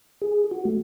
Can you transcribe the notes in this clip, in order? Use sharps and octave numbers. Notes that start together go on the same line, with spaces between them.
G#4
F#4
A3